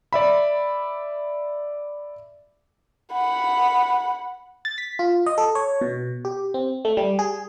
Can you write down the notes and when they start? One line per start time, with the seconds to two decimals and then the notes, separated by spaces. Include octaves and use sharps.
0.13 D5 E5 B5
3.12 F#5 B5
4.65 A6
4.78 B6
4.99 F4
5.26 D#5
5.38 A4
5.55 C#5
5.81 B2
6.25 G4
6.54 C4
6.85 A3
6.97 G3
7.19 G#4